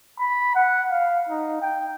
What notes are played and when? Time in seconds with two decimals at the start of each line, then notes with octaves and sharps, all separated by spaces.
0.19 B5
0.55 F#5
0.91 F5
1.29 D#4
1.62 G5